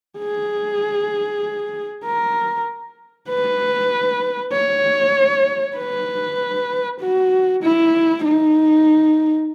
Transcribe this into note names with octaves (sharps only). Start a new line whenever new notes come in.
G#4
A#4
B4
C#5
B4
F#4
E4
D#4